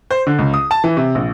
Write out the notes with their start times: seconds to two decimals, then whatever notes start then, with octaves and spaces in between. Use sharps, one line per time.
0.11 C5
0.27 D3
0.39 C#2
0.54 D#6
0.71 A5
0.84 E3
0.97 C3
1.15 A#1